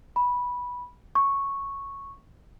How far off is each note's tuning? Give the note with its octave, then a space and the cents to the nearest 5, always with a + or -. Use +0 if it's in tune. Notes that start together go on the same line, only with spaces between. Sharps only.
B5 -10
C#6 -5